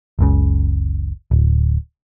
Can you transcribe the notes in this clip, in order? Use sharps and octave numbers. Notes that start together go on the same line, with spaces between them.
F#1 C#2 C#3
D1